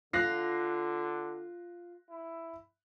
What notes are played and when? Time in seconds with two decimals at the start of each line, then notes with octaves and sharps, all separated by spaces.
0.13 D3 F4 F#6 A#6 C7
2.10 E4